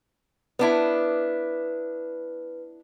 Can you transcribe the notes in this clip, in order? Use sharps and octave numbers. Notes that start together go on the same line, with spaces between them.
B3 D4 E4 B4